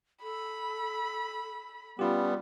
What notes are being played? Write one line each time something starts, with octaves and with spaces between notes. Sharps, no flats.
A4 B5
G3 B3 C#4 F4 G4